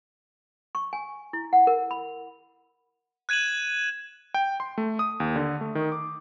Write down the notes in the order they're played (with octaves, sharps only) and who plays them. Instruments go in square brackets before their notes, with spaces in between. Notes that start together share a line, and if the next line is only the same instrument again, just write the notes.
[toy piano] C#6
G#5
E4
F#5
A#4
B5
[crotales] F#6 G#6 D#7 E7 F#7
[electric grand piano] G5
C6
A3
D#6
D#2
D3
A3
D#3
D6